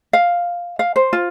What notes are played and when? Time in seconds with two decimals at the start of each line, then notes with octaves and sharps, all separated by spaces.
0.13 F5
0.79 F5
0.96 C5
1.13 F4